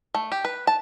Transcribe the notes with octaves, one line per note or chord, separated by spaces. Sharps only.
A3
G4
B4
A5